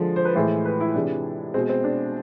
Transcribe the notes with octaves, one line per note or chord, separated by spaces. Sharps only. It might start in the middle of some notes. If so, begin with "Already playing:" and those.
Already playing: D3 F3 G#3
C5
B4
A2 E3 G#3 C5
B4
E4
C3 E3 G#3 D4
B2 G#3 C4
C4
D4